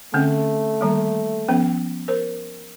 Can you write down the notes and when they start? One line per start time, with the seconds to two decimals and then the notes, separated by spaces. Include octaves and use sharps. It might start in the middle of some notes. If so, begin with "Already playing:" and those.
0.14 D3 A3 C4 C#4
0.81 D#3 G3 A#3
1.48 F3 B3 C#4
2.08 A#4 C5